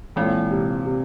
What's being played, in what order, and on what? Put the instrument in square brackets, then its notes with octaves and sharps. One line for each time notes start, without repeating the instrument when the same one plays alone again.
[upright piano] A#2 [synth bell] E3 G#3 C4 E4
[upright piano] C3
C3